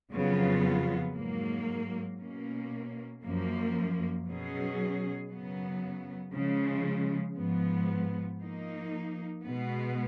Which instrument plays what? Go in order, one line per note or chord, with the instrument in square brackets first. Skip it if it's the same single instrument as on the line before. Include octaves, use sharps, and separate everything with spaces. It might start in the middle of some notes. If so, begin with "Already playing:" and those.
[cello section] F2 C#3 F#3 B3 F4
G#2 F#3 A#3
B2 A#3 C#4
F#2 F3 A#3
B2 F#3 C#4 G#4
F#2 C#3 F#3 B3
C#3 F3 G#3
G#2 F3 B3
F3 A#3 D#4
B2 G#3 B3